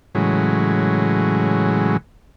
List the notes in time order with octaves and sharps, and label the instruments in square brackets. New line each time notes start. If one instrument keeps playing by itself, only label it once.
[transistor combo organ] A2 C#3 E3 F#3 G#3